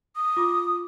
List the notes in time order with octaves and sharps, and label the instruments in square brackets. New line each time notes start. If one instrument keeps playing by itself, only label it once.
[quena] D#6
[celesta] F4 D6